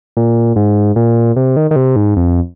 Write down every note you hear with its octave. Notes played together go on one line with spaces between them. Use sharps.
A#2
G#2
A#2
C3
D#3
D#3
C3
G#2
F2